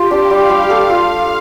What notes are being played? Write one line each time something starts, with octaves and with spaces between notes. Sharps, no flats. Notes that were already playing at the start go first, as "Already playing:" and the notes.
Already playing: F4 G4
D4
G3 F5
G3
A4 F5
F4